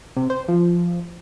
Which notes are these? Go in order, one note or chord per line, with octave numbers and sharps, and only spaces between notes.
C3
C5
F3